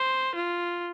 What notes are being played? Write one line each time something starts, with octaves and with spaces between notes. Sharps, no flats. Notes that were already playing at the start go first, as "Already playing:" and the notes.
Already playing: C5
F4